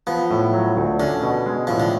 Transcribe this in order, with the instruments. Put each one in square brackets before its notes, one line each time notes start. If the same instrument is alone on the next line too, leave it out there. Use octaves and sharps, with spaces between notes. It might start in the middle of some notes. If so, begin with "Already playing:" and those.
[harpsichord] F3 [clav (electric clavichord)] B3
[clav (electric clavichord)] A2
F#3
D2
[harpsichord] D3 [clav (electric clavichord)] C#4
[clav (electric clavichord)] B2
G#3
[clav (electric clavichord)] A2 [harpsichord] F3
[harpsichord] D3